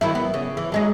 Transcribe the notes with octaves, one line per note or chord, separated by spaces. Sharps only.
D#3 F#3 E4
B3
C#3
E3
F#3 G#3 D#4